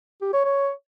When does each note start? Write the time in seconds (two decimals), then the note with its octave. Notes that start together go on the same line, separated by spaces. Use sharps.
0.22 G4
0.33 C#5
0.45 C#5